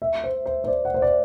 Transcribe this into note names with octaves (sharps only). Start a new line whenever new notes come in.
E5
C5
C5
C5
D5
F#5
C5
D5